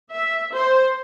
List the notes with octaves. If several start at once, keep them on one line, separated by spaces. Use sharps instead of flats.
E5
C5